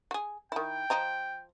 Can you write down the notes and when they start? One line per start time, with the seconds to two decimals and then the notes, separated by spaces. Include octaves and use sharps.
0.11 F#4 G#4
0.52 D#3 E4 G5
0.90 F3 D#5 A#5